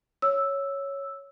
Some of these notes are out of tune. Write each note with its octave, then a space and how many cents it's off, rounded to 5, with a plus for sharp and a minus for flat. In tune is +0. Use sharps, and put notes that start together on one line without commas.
C#5 +0 E6 +0